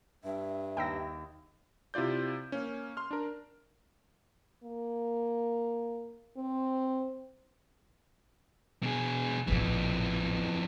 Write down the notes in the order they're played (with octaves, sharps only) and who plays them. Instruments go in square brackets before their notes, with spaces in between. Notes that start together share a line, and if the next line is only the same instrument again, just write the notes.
[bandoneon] G2 [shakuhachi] E5
[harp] D#2 [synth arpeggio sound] G5 E6 A#6
[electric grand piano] C3 E4 F4 D5 G6
A#3 C#4
C6 F6
D4 A#4
[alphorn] A#3
C4
[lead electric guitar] B2 G#4
[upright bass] A1 A#2 [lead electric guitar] F2 E3